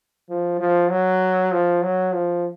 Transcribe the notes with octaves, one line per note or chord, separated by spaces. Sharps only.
F3
F3
F#3
F3
F#3
F3